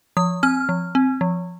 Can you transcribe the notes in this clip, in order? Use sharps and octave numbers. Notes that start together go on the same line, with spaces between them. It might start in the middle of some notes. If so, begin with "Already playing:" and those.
F3 D#6
C4 F6
F3
C4
F3